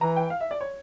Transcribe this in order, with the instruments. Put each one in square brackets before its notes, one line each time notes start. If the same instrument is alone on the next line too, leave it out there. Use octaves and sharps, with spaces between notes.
[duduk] E3 [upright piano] A#5
[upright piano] G5
F5
E5
D5
C#5